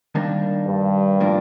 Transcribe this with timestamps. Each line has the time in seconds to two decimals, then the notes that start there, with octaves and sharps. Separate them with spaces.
0.15 D#2 D#3 G3 A#3 D4
0.67 G2
1.20 A2 F3 A#3 D4